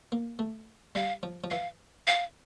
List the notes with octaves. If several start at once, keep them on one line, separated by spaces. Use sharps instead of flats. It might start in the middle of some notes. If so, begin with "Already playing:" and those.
A#3
A3
G3 F5
F3
F3
E3 F5
F5